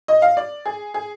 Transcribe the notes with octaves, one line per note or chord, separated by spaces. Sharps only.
D#5
F5
D5
G#4
G#4